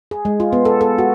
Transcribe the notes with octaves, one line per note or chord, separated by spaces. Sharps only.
G#4
G#3
F4
B3
A4
A4
F#4